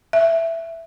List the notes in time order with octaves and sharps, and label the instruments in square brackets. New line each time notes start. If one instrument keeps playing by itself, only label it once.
[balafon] E5